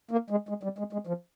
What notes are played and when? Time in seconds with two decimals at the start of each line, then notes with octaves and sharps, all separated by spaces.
0.11 A#3
0.30 G#3
0.49 G#3
0.63 G3
0.78 G#3
0.93 G#3
1.07 F3